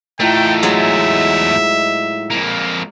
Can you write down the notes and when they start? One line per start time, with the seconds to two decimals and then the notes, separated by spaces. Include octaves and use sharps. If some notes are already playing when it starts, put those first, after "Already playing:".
0.20 E2 A2 A3 D#4 F4 G5
0.63 F#3 G#3 E5
2.30 F2 A#3